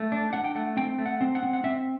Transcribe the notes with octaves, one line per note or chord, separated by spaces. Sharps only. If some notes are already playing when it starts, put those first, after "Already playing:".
Already playing: A3
D4
D4 F#5
G5
A3 F#5
C4 G5
A3
F#5
C4
F#5
C4
F#5
C4 E5